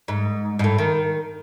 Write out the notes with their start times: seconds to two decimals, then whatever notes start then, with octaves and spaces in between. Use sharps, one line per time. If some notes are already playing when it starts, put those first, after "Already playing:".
0.08 G#2
0.59 G#2
0.64 A2
0.78 D#3